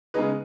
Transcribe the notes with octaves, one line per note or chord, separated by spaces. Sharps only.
C#3 G#3 B3 D#4 G#4 B4